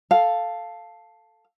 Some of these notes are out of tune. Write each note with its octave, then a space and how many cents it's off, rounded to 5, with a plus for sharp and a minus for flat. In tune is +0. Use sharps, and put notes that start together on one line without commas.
A4 +0 F5 +0